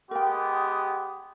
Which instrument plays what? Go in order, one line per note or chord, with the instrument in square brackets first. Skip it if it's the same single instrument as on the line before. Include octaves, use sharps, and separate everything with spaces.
[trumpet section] G#3 B3 G4 [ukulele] A#4 G5